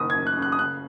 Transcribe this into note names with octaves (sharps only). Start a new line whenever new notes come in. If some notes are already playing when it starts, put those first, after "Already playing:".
Already playing: F#1 D#3 D#6
G#6
F#2
F#6
C#3
F#6
D#6
C#3 F#6